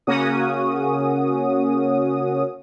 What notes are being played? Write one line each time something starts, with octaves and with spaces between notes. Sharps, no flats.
C#3 A#3 C#4 F#4 D#6